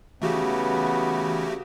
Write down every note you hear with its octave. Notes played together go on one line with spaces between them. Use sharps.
C#3 E3 A3 B3 F#4 G4